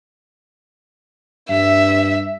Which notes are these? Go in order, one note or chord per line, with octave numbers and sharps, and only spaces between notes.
G2 E5